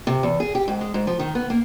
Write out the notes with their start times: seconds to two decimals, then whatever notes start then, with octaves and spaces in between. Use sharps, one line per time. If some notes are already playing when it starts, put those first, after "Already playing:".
0.07 C3
0.23 E2
0.40 G#4
0.55 G4
0.68 G#2
0.81 G#3
0.94 G#2
1.07 F3
1.19 D#3
1.35 B3
1.50 A#3